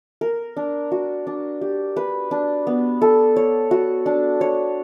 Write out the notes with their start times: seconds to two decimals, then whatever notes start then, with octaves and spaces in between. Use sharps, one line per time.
0.21 A#4
0.57 D4
0.91 F#4
1.27 D4
1.61 G4
1.96 B4
2.31 D4
2.67 B3
3.01 A4
3.36 C#5
3.71 F#4
4.06 D4
4.41 C#5